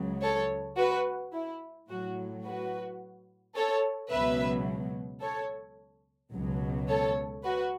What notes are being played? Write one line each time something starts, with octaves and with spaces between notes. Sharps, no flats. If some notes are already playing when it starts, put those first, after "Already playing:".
Already playing: C#2 C#3 F#3
A4 C#5
F#4 B4
E4
A2 F#3 F#4
F#4 B4
A4 C#5
C#2 B2 F#3 B4 E5
A4 C#5
C#2 B2 F#3
A4 C#5
F#4 B4